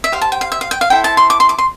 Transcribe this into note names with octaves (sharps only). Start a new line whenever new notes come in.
E5
G4 C5 F5
A5
G5
F5
E5
F5
G5
F5
E4 A4 C5 G5
A5
C6
D6
C6
D6
C6